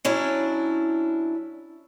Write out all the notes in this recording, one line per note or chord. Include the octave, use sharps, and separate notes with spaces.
F#3 C#4 D4 E4